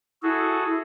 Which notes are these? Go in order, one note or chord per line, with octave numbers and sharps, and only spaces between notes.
E4 F#4 G#4 A4